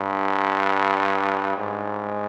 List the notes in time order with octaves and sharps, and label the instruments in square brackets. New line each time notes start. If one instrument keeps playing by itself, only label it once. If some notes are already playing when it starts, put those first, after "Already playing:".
Already playing: [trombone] G2
G#2